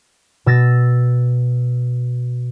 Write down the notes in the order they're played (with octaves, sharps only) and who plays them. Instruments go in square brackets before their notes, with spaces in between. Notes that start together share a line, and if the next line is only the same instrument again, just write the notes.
[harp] B2 E6 A6 A#6